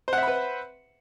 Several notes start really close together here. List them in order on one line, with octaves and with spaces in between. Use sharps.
C5 F#5 E5 B5 B4